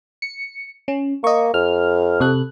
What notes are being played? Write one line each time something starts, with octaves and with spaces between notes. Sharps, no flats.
C#7
C#4
A#3 D#5 C#6
F2 F6
C3 A4 F#6